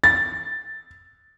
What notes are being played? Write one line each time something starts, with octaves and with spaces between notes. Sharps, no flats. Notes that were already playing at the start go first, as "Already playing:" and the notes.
A6